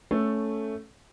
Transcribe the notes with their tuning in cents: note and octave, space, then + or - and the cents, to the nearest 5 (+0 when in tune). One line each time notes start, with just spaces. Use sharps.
A3 +0 C#4 +0 A4 +0